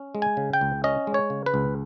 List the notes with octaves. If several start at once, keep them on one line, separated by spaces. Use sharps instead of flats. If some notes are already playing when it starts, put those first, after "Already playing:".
Already playing: C#4
G#3
G#5
C#3
G5
C#2
C#4 D#5
G#3
C#5
C#3
B4
C#2